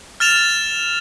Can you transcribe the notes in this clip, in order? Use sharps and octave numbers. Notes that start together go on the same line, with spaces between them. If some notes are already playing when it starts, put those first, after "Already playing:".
F6 A6 E7 F7